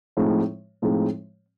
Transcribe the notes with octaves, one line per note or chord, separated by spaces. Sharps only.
A2 F3 G#3 C4 D#4
A2 F3 G#3 C4 D#4